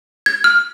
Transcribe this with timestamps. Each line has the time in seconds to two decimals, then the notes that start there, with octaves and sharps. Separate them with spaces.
0.26 G#6
0.44 F6